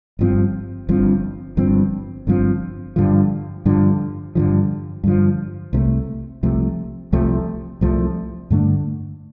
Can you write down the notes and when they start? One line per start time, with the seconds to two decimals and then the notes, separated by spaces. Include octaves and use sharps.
0.19 G1 G2 F3 C4
0.89 G1 G2 F3 C4
1.57 G1 G2 F3 C4
2.27 G1 G2 F3 C4
2.96 G2 D3 F3
3.65 G2 D3 F3
4.35 G2 D3 F3
5.04 G2 D3 F3
5.73 C2 C3 F3 A3
6.43 C2 C3 F3 A3
7.12 C2 C3 F3 A3
7.81 C2 C3 F3 A3
8.50 G2 D3 A3 D4